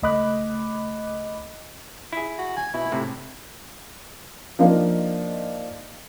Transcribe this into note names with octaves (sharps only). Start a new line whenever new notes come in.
C#2 A3 D#5 B5 D6 F#6
E4 G#4
F#4
G#5
B2 E4
A2 C3
F3 A#3 D4 D#4 D#5 F5